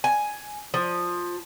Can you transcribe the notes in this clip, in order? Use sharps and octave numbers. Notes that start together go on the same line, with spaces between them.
G#5
F3